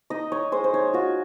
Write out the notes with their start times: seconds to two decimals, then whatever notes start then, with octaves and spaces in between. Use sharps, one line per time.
0.10 D#4 D#5
0.32 D#4 C#5
0.52 G#3 C5
0.64 C5
0.74 D#4 C#5
0.93 F4 F#4